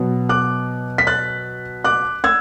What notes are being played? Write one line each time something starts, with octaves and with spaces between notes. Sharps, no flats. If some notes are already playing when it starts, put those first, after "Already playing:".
Already playing: B2 F#3 B3
D6 F#6
B6
F#6 A6
D6 F#6
E6 G#6